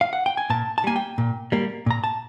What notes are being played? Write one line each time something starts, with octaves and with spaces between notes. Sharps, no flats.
F5
F#5
G5
G#5
A#2 A5
A5
G3 A#3 G#5
G5
A#2
G3 A#3
A#2 A#5
A5